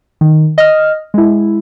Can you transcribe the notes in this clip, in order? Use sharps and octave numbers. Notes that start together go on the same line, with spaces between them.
D#3
D#5 F6
G#3 E4